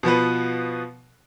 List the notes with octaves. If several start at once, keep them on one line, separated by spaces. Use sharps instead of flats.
B2 F3 B3 B4